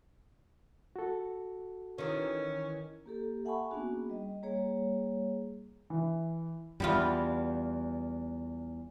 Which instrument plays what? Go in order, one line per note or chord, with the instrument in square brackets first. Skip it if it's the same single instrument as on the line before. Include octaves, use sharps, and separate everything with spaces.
[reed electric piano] F#4 A4
[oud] D#3 E3 [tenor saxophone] C#4
[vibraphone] A#3 G4 A4
E5 F#5 G#5 A5 B5 C#6
A#3 B3 C#4 D4 F#4 G#4
G3 D#5
G3 A#3 G#4 C#5
[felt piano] E3
[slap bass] E2 [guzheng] G3 B3 F4